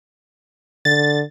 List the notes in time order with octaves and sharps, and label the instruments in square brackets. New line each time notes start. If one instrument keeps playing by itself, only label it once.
[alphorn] D3 [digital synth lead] A6